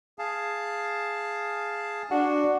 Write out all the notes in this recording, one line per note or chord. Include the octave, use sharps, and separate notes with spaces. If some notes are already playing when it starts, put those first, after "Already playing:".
G#4 F5 A5
D4 F#4